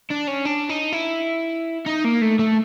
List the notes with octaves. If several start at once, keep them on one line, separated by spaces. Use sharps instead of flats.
D4
C#4
D4
D#4
E4
D#4
A#3
A3
A3